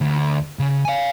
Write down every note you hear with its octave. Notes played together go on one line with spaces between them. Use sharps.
D2
C#3
F5 G#5